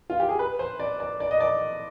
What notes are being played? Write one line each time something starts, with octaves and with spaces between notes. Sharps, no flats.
F4
G4
G#4
B4
C5
D5
D5
D5
D#5
D5